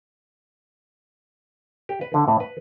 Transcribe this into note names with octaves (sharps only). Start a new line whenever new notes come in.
G4
B4
D3
A2
B4